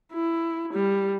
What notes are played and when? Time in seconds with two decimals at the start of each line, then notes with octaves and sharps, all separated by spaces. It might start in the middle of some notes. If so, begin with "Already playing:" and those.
0.13 E4
0.73 G3